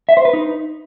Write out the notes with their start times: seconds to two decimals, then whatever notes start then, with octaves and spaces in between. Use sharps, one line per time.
0.09 E5
0.17 C5
0.25 B4
0.33 D#4